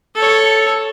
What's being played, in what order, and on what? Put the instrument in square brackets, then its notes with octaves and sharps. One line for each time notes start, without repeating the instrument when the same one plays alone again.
[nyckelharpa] A4 C#5